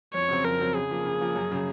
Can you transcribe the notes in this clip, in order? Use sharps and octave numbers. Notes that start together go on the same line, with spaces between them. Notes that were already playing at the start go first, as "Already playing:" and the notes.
F2 C#5
C#3 F#3 C4
F2 A#4
C#3 F#3 C4
C#3 G#4
F3 A#3
C#3
F3 A#3
F#2
C#3 F#3